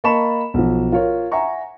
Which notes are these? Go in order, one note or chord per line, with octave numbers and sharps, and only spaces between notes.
A#3 D#5 A5 B5 C#6 E7
B1 F3
F4 A#4 C#5
E5 F#5 G#5 A#5 C#6